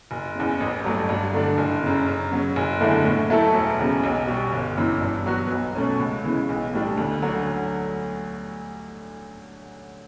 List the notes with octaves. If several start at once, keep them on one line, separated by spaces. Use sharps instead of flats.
F#1
E2 C#3
A1
G2 F#3 A3
G2
D3 A3 D4
F#1
F#2 C#3
F#2
C#3 F#3
F#1
E2 D3 A3 E4
A2
F#3 A3 E4 A4
E1
E2 C#3
B1
B2 G3
G1
F#2 E3
G2
F#3 B3 F#4
B1
B2 A3 C#4
C#2
C#3 E3
B1
A2 G3 D4
D2
D3 F#3